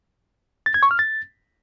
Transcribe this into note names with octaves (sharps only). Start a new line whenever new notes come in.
A6
G#6
C#6
F6
A6